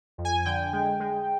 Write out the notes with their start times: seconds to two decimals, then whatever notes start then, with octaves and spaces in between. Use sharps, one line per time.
0.18 F2
0.25 G#5
0.45 D3 G5
0.73 G#3
1.00 G#3